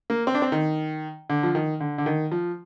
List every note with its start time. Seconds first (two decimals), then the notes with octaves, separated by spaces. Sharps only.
0.10 A#3
0.27 C4
0.34 D4
0.42 C4
0.52 D#3
1.30 D3
1.43 F3
1.55 D#3
1.80 D3
1.98 D3
2.06 D#3
2.32 F3